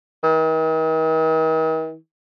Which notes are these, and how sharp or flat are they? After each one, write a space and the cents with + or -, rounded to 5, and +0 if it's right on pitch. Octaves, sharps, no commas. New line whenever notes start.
D#3 +45